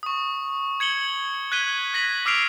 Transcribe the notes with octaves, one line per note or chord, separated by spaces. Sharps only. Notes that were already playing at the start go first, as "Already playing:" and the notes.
C#6 D#6
G#6 C#7 F#7 G7
F#6 G#6 B6 D#7 G7
G#6 A#6 B6 F#7
D6 E6 F6 C7 D7 F7